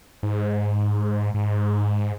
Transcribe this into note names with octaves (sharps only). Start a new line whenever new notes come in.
G#2
G#2